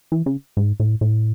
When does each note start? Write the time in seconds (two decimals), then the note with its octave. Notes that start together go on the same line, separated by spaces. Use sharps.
0.12 E3
0.26 C#3
0.57 G#2
0.80 A2
1.01 A2